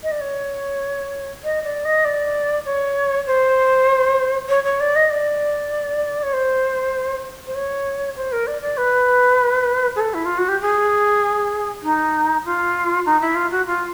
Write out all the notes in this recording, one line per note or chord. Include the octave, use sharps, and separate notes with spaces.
D#5
D5
C#5
D#5
D5
D#5
D5
C#5
C5
C#5
C#5
D5
D#5
D5
C#5
C5
C5
C#5
C5
A#4
D5
D5
B4
G#4
A4
E4
F4
F#4
G4
G#4
D#4
F4
D#4
E4
F4
F#4
F4